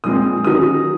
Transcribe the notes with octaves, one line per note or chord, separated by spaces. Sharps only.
A#2 G#3 C4 D#6
D#3 F#3 C#4 D#6